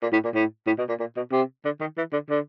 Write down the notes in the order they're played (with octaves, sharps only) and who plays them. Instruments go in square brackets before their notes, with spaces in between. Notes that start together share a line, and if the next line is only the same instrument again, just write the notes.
[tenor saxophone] A#2
A2
A#2
A2
A2
B2
A#2
A#2
B2
C3
D3
D#3
E3
D3
D3